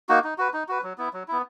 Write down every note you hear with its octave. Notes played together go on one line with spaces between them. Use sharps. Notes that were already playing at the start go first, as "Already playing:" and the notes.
A#3 D#4 F#4
D#4
F#4 B4
D#4
F#4 B4
F#3
B3 E4
F#3
B3 E4